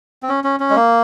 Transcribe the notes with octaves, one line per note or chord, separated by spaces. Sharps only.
C4
C#4
C#4
C#4
G#3
A#3